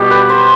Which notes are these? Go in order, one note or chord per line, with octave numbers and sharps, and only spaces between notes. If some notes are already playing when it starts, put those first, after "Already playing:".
Already playing: B2 G3 G4
B4
C5